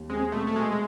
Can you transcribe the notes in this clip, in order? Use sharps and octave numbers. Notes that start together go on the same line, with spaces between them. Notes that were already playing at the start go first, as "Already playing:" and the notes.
Already playing: D#2
G#3 C4
B2 A3
A3
B2 G#3
G#3